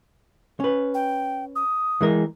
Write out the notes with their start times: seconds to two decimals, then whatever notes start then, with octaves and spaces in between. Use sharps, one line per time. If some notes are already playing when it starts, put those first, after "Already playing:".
0.60 C#4 B4
0.94 G5
1.56 D#6
2.01 E3 G#3 A#4